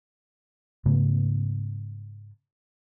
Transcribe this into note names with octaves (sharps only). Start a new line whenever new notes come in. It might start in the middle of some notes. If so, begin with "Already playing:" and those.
G#2 C#3 A3 B3